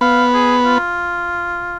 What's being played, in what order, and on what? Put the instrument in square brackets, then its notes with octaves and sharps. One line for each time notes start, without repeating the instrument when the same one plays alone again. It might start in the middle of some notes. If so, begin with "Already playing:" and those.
[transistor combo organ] B3 [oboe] F5
[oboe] G#4
F4